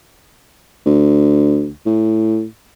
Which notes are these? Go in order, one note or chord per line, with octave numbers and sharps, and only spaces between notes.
D2
A2